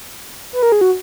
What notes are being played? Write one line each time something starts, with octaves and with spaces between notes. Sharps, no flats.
B4
A#4
G#4
F#4